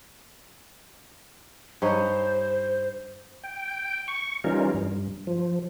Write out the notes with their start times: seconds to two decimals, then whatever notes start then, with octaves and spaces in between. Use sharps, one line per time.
1.82 G2 D#4 C5 C#5
3.43 G5
4.08 C#6
4.44 E3 G3 C#4 D#4 F4 A#4
4.74 G2
5.27 F3